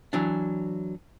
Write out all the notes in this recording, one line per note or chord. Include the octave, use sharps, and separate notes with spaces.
E3 F#3 D4